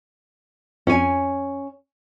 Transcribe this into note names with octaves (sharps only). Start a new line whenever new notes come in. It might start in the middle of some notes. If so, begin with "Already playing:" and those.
F2 C#4 G#5